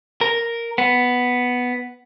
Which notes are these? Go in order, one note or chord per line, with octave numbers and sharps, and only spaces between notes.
A#4
B3